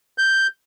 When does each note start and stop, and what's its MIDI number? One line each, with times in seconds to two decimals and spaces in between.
0.18 0.47 91